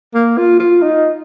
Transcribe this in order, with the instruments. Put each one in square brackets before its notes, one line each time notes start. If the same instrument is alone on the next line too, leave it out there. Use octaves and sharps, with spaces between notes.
[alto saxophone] A#3
F4
F4
D#4